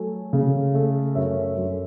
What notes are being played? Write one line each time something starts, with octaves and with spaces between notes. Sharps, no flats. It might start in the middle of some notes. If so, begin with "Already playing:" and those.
Already playing: F#3 A3 G#5
C#3
A3
F#2 C#5 E5
F#2